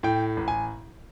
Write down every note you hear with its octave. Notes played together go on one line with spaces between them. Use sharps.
A2 G5
A1
G#5